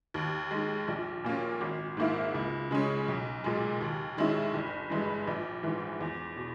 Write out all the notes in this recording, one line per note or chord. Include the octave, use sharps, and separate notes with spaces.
D#2
D#3 G#3
A#1
A#2 A#3 C#4
G#1
G#2 D#3 A#3 E4
C#2
C#3 G#3 C#4
B1
A#2 G#3
D#2
D#3 G#3 C#4 E4
G1
G2 E3 G#3
A#1
G#2 E3
E2
B2